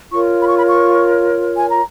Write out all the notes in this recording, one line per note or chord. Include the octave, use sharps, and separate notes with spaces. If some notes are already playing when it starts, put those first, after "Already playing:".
F4 A#4 C#5 C#6
B5
C#6
B5
C#6
G#5
A#5